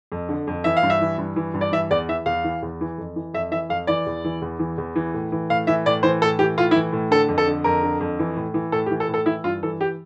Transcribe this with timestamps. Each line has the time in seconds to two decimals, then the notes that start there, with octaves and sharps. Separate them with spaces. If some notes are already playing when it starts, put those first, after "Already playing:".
0.12 F2
0.29 D3
0.47 F2
0.64 E3 E5
0.77 F5
0.83 G2
0.90 E5
1.01 E3
1.18 G2
1.36 E3
1.54 G2
1.61 D5
1.72 E3 E5
1.91 E2 D5
2.08 E3 E5
2.26 E2 F5
2.44 E3
2.62 E2
2.81 E3
2.98 F2
3.16 E3
3.34 F2 E5
3.51 E3 E5
3.69 F2 F5
3.87 E3 D5
4.06 E2
4.24 E3
4.42 E2
4.59 E3
4.78 E2
4.96 E3
5.14 A2
5.32 E3
5.50 A2 F5
5.67 E3 E5
5.86 A2 D5
6.03 E3 C5
6.22 A2 A4
6.39 E3 G4
6.58 A2 F4
6.71 E4
6.75 E3
6.93 A2
7.11 D3 A4
7.29 F2
7.38 A4
7.47 D3
7.64 F2 A#4
7.83 D3
8.00 F2
8.19 E3
8.36 A2
8.54 E3
8.72 A2 A4
8.86 G4
8.91 E3
9.00 A4
9.08 A2
9.14 A4
9.26 E3 E4
9.44 G2 F4
9.63 E3 A4
9.81 G4